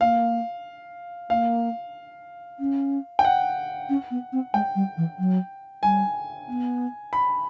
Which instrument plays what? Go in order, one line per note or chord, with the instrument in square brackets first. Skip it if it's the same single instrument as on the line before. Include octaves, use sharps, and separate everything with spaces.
[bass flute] A#3 [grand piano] F5
[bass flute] A#3 [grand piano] F5
[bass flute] C#4
[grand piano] G5
F#5
[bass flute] C#4
B3
C4
[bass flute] G#3 [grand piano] G5
[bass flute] G3
E3
F#3
[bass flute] G3 [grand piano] G#5
[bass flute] B3
[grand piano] B5